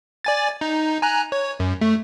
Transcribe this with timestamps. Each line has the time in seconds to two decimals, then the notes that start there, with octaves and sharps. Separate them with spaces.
0.25 D5 G#5 A6
0.61 D#4
1.02 G#5 A#5 F#6
1.32 C#5
1.60 F#2
1.81 A3